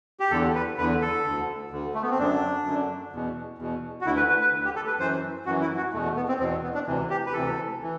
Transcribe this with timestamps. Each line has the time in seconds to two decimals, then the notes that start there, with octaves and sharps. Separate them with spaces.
0.20 G4
0.31 E2 D3 A4
0.55 B4
0.78 D3 B4
0.80 E2
1.01 A4
1.25 D2 D3
1.71 D2 D3
1.95 A3
2.02 B3
2.10 C4
2.19 F#2 D3 D4
2.65 F#2 D3
3.13 E2 B2
3.58 E2 B2
4.01 F#4
4.06 D2 D3 E4
4.17 B4
4.29 B4
4.41 B4
4.52 D2 D3
4.65 G4
4.76 A4
4.87 B4
4.99 F#2 E3 C5
5.46 F#2 E3 F#4
5.61 E4
5.77 F#4
5.93 E2 B2 A3
6.04 A3
6.16 B3
6.28 C4
6.39 E2 B2 C4
6.63 B3
6.74 D4
6.87 D2 C3 E3
7.10 G4
7.26 B4
7.33 D2 C3 E3 A4
7.83 E3